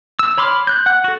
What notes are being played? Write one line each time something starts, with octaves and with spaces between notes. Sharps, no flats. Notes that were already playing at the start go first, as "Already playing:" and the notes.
E6
C#5 B5 C6 D6 F6
F#6 G6
F#5 F#6
F#4 A4